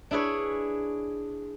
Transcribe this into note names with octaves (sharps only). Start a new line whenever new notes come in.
D4 E4 G#4 B4 C#5